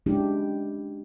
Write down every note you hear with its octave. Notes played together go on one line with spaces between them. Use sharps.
F#3 G#3 C#4 D4 E4 G4